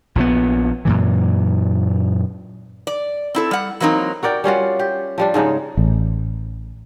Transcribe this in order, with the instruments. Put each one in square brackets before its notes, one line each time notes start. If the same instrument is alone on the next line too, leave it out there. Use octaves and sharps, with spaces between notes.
[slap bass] A#1 A#2 C#3 B3
F#2 A#2 E3
[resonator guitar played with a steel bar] D5
C4 E4 A4
G3 F#5
E3 F#3 A#3 C4 D#4
[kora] F#4 A#4 D5 G5
G3 C#4 F4 F#4
G4
F3 G3 D4
G#2 C#3 G#3 D#4
[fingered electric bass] A1